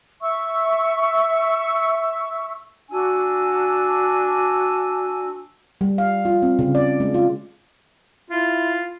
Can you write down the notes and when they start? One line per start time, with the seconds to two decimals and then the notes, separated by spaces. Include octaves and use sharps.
0.22 E5 C#6 E6
2.90 D4 F#4 G#5 E6
5.81 G3
5.98 F5
6.25 F4
6.42 C4
6.59 C#3
6.75 D5
7.00 G#3
7.14 F4
8.30 E4 F4